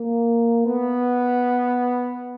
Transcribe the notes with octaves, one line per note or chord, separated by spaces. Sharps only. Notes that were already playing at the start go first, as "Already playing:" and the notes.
Already playing: A#3
B3